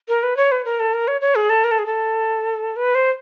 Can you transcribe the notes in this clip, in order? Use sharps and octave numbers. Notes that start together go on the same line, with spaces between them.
A#4
B4
C#5
B4
A#4
A4
A#4
C#5
C#5
G#4
A4
A#4
A4
G#4
A4
B4
C5